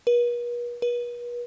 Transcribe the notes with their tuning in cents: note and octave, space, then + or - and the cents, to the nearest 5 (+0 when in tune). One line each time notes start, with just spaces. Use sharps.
B4 -45
B4 -40